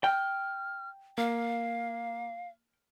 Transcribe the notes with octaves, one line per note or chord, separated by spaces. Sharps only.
G5 F6
A#3 F5 F6